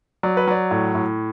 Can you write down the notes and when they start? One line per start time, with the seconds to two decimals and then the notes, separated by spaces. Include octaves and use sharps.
0.23 F#3 D5
0.37 B4
0.47 F#3 D5
0.71 A2
0.95 A2